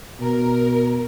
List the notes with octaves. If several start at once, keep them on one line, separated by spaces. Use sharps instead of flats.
B2 A#4